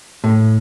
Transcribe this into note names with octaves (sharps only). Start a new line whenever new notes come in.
A2